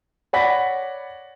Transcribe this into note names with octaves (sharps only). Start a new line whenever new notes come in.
C#5 D5 F#5 B5 A#6 B6